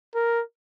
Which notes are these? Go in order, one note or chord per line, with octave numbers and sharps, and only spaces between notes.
A#4